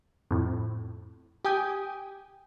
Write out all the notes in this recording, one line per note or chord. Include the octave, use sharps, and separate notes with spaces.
F2 A2
G4 G5 G#5 D#6 G6